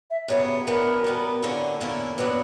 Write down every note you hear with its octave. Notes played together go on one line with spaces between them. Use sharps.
E5
F#2 C#3 G3 B3 C#5
F#2 E3 B3 D4 A#4
B2 G3 B3
G2 D3 A#3 C#4 E4
E2 D3 A#3 C#4 E4
F#2 D3 F#3 B3 D4 B4